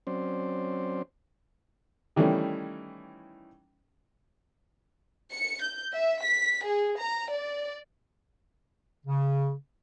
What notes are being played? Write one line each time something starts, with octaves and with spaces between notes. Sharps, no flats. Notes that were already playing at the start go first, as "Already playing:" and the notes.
F#3 C4 C#4 C5 D5
D#3 E3 G3 A3 C#4
C#7
G6
E5
B6
G#4
A#5
D5
C#3